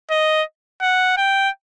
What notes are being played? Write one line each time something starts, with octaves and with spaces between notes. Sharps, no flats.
D#5
F#5
G5